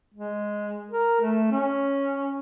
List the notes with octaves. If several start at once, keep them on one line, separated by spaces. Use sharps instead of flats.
G#3
A#4
A3
C#4